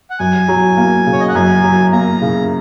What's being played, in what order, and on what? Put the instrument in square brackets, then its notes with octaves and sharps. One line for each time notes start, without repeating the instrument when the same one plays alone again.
[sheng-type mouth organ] F#5
[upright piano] F#2 [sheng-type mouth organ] G#5
[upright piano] F#3
A#3
C#3
[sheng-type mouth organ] C#5
D#5
F#5
[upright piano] F#2 [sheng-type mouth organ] G#5
[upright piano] F#3
[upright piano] A#3 [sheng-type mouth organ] A#5
[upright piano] C#3